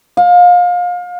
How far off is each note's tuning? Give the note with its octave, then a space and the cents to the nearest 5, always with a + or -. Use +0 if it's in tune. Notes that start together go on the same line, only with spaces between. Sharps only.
F5 +30